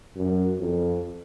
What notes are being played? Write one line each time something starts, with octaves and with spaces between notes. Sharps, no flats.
F#2
F2